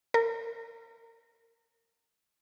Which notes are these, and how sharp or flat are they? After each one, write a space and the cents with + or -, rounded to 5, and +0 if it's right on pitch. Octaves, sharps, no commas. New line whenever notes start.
A#4 -30